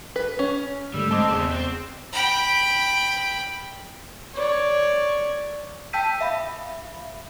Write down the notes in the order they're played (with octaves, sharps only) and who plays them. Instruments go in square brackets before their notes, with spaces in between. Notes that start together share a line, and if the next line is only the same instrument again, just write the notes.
[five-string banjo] B4
C#4
[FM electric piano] G#2 D3 A3 [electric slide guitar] G3 [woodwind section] E6
[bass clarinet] G#3 [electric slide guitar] C4 [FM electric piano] A5 D6
[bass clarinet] E2 [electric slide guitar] C#3 C4
[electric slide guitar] C4 [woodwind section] F#4 A4 C5
[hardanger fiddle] G5 B5
[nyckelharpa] C#5 D5
[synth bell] G5 A5 E6 G6 B6 D#7
E5 F5 B5